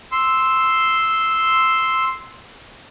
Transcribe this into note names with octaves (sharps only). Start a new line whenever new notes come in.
C6 E6